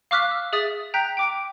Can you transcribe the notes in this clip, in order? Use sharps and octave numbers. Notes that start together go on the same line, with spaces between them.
F5 C#6 D6 F6 F#6 B6
E6
G#4 E5 D#6 A6
G5 A#5 F#6 G6 B6
G5 D6 D7